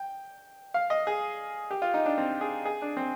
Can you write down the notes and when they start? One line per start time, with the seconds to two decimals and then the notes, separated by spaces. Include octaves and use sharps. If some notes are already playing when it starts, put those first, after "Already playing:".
Already playing: G5
0.74 F5
0.90 D#5
1.07 G#4
1.71 G4
1.82 F4
1.94 D#4
2.06 D4
2.18 C4
2.41 G#4
2.65 G#4
2.82 D4
2.97 C4